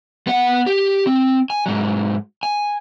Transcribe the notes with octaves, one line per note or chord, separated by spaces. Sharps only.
B3 F#5
G4
C4
G#5
G#2 F#3
G#5